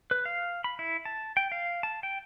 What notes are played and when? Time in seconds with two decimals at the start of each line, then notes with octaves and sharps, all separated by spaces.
0.11 B4
0.25 F5
0.64 B5
0.79 E4
1.05 A5
1.37 G5
1.52 F5
1.83 A5
2.03 G5